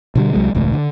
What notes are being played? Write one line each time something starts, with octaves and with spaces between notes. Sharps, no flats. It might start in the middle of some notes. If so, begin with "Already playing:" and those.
B2 D3 G3
C2 F#3 G#3
E1 C#2 A2
D3